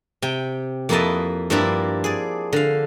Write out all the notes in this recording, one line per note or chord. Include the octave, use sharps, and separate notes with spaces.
C3 G5
F2 A#3 E4 B4 D#5 A5
G2 F3 A#3 C4 D4 E4
G#4 D5
D3 F5